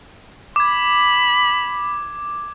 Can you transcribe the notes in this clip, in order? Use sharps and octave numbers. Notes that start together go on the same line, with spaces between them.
B5 D6 G#6